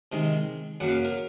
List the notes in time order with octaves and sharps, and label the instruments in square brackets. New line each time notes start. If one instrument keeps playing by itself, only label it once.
[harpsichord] C3 D#3 G#3 D#5
F#2 C#3 F#3 A#3 F#5
F5
A#4